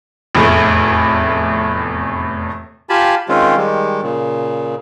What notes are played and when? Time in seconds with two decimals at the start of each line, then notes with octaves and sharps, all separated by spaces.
0.35 F1 E2 A2
2.90 F4 G4 G#5 A5 B5
3.29 D#3 G#3 C4 C#4 F4
3.57 D#3 G3 G#3
4.02 A#2 C#3